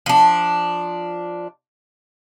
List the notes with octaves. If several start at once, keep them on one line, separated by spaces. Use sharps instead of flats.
F3 D4